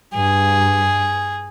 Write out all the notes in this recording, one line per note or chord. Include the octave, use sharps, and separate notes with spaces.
G2 G#4